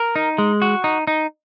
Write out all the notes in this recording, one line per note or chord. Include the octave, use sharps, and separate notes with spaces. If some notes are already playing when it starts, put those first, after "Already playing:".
Already playing: A#4
D#4
G#3
F#4
D#4
D#4